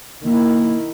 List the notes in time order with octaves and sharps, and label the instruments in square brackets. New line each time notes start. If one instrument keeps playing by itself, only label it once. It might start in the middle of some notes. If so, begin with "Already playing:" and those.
[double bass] D#3 E4 [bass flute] A#3